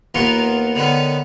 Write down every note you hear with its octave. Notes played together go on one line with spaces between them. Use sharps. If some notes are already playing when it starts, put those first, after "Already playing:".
D#2 E3 B3 F4 A#4 C#6
D3 D#3 B3 C#4